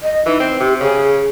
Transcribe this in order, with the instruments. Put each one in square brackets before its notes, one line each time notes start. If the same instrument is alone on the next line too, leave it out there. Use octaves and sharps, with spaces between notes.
[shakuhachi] D#5
[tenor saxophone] E3 [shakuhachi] D#4
[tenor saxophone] C4
[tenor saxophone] C3 [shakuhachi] G4
[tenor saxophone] C#3 [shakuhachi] G#4